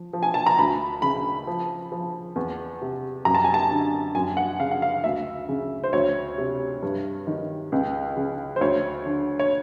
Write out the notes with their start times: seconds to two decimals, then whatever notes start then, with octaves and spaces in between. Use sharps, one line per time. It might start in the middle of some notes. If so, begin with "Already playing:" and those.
Already playing: F3
0.13 F3
0.23 G#5
0.34 A5
0.47 A#5
0.59 D2 B5
1.02 C#3 B5
1.47 F3
1.92 F3
2.36 E2
2.82 C3
3.25 F#2 A#5
3.35 A5
3.44 G#5
3.54 A5
3.71 D3
4.15 F#2 G#5
4.37 F#5
4.60 C#3 F5
4.71 F#5
4.82 F5
5.04 D2 E5
5.49 C#3
5.84 C5
5.93 D2 C#5
6.38 C3
6.82 G2
7.27 D#3
7.72 C#2
8.17 C#3
8.56 C5
8.61 D2 C#5
9.06 D3
9.39 C#5